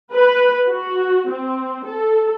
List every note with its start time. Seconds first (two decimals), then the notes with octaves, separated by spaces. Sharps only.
0.13 B4
0.68 F#4
1.29 C4
1.86 A4